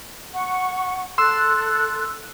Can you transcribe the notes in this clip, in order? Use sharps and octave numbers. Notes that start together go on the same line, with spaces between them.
F#5 C#6
A4 C6 E6 F#6